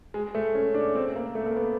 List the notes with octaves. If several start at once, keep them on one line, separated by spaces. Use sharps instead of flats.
G#3
A3
C#4
D4
C4
A#3
A3
A#3
B3